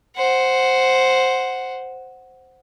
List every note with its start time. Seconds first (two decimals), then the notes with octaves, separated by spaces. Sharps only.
0.16 C5 F#5